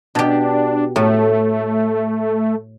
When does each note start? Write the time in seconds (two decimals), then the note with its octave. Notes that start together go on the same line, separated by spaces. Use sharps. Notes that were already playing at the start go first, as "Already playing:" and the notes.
0.15 B2 D4 G4
0.96 A2 A3